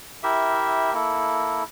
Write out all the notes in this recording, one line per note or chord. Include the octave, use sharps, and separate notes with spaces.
E4 G4 A#4 E5
A#3 E4 A4